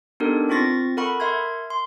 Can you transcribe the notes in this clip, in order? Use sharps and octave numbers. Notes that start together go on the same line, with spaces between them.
B3 D4 D#4 G4 A4 A#4
C4 F4 C#6 A6 A#6
A4 A#4 F#5 B5 C#6
A#4 E5 C6 G#6
C6